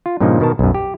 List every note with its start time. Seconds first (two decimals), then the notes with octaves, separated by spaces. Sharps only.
0.06 F4
0.20 G2 A#2 C#3 F3 D#4
0.40 B2 D#3 A#4 A5
0.59 B1 F#2
0.75 G4